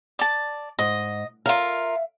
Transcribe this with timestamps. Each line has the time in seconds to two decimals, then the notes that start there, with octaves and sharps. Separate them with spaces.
0.19 D5 A5
0.79 G#2 D#5
1.46 F4 A#4 E5 F5